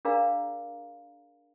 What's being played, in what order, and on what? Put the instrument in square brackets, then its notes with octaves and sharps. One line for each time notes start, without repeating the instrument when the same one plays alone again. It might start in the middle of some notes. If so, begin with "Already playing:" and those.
[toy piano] D4 G#4 A#4 D5 F5 A#5